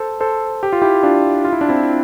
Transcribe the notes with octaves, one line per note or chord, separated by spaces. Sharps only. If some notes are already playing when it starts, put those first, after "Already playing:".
Already playing: A4 C5
A4 C5
G4
F4
E4 G4
D4 F4
F4
E4
D4
C4 E4